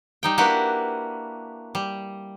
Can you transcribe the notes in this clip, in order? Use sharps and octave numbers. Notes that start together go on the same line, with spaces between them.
G3 D#4 G5
A#3 D4 E4 F#4 G4 B4
G3